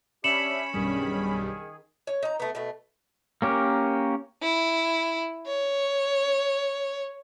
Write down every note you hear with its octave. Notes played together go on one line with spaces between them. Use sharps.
C#4 D4 G4 E5 B5 C#7 E7 F#7
B1 G2 D#3 G3 G#4
C#5
D#4 A#5
A3 B3
B2 A3
A#3 C#4 G4 A#4
E4
C#5